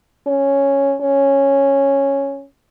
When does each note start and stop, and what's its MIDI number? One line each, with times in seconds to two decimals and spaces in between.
0.27 0.96 61
1.01 2.45 61